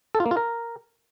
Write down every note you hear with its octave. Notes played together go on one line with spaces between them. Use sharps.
A4
F4
A#3
F4
A#4